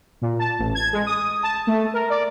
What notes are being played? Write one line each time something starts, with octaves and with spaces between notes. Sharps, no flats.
A#2
A5
A1
G#6
G#3
D#6
A5
A3
A#4
D5